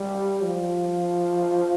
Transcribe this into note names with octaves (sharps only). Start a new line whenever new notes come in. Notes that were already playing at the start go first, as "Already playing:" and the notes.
Already playing: G3
F3